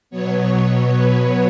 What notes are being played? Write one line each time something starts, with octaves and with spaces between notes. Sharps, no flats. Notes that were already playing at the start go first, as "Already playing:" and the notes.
B2 F#3 B3 C#5
B4